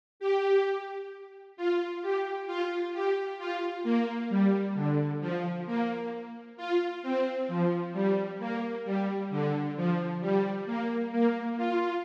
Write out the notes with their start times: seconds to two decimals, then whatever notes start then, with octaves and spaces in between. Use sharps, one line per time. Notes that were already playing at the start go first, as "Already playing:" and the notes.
0.20 G4
1.57 F4
2.02 G4
2.47 F4
2.94 G4
3.39 F4
3.84 A#3
4.30 G3
4.75 D3
5.20 F3
5.66 A#3
6.57 F4
7.03 C4
7.48 F3
7.93 G3
8.39 A#3
8.85 G3
9.31 D3
9.76 F3
10.21 G3
10.66 A#3
11.12 A#3
11.57 F4